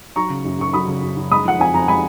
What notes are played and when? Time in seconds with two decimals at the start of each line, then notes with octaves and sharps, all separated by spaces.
0.16 F#3 A#5 C#6
0.30 C#3
0.45 F#2
0.59 F#2 C#6
0.73 F#3 B5 D#6
0.88 C#3
1.02 F#2
1.17 F#2
1.31 G#3 B5 D#6
1.45 F3 F#5
1.59 F2 G#5
1.74 F2 A#5
1.88 G#3 G#5 B5